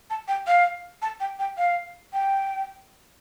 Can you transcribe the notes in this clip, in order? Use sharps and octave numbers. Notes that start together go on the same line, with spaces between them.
A5
G5
F5
A5
G5
G5
F5
G5